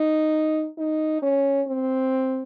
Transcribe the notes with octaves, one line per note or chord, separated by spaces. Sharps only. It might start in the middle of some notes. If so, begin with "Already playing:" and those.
Already playing: D#4
D#4
C#4
C4